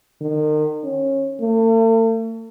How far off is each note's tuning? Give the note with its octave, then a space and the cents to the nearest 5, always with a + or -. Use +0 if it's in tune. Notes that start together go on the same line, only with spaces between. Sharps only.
D#3 -35
C#4 -25
A3 +45